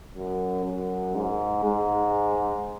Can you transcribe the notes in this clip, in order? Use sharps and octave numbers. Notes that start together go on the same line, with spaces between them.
F#2
F#2
G#2
G#2